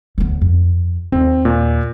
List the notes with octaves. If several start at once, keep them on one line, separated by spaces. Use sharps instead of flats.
D2 B3
F2
D#2 C4
A#2